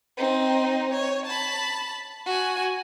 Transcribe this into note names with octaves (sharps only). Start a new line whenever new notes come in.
C4 D#4
C#5
A5 B5
F#4 G#5